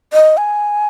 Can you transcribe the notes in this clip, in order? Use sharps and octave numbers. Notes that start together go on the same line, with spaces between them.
D#5
G#5